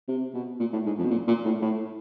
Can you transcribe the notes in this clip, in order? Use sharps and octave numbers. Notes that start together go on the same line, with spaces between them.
C3
B2
A#2
A2
G#2
F2
B2
A#2
A#2
A2
A2